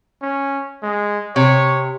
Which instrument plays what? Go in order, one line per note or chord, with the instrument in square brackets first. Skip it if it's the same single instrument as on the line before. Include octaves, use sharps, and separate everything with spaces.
[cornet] C#4
G#3
[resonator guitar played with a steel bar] C3 [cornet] C#5